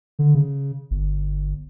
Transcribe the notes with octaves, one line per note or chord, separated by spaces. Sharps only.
D3
C#3
G1